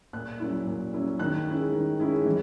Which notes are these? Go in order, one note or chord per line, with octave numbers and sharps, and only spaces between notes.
A#2 F#6
F#3 C#4 E4
A#2
F#3 C#4 E4
D#3 F#6
G#3 C#4 E4
D#3
G#3 C#4 E4
E3